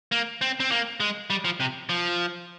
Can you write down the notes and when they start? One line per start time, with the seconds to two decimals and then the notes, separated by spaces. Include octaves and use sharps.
0.12 A#3
0.41 C4
0.60 C4
0.71 A#3
1.00 G#3
1.30 G3
1.45 F3
1.60 C3
1.89 F3